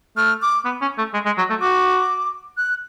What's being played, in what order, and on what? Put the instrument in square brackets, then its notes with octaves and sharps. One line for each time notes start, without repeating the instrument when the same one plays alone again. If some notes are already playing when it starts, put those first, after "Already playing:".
[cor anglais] A3 [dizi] F6
[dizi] D6
[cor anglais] B3
C#4
A3
G#3
G#3
F#3
A3
[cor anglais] F#4 [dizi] D6
[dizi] F#6